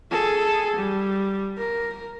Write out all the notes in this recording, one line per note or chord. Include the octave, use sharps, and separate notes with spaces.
G#4 A4
G3
A#4